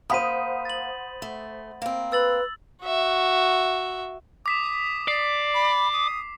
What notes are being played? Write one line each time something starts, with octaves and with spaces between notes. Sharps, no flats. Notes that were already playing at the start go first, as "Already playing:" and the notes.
A#3 C5 F#5 B5 D#6 B6 D#7
A6 F#7
A3
A#3 C4
B4 E6 A6 F#7
F#4 E5
D6 D#6 B6 E7
D5 C7
B5
D#6